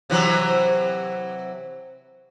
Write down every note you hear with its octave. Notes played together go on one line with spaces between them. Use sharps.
C3 E3 F#3